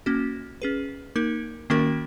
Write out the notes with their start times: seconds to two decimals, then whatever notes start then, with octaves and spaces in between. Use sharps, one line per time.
0.06 A#3 C#4 F#4
0.62 C#4 G#4 B4
1.16 A#3 D#4 A#4
1.70 D#3 A#3 C#4 F#4 A#4